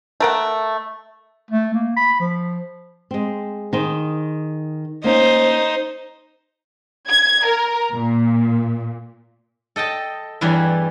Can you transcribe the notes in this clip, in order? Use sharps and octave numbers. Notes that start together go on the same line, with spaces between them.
A3 A#4 F#5
A3
A#3
B5
F3
G#3 C4
D#3 G#4 C5
A#3 C#4 D#4 C5
G#6
A#4
A#2
A4 D#5 G5 A5
E2 G2 E3 G3